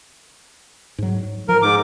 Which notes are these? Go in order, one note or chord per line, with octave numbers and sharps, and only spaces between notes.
G#2 F#3
F3 A#4
G#2 D6